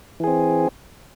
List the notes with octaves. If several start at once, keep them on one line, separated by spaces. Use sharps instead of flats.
E3 C4 G#4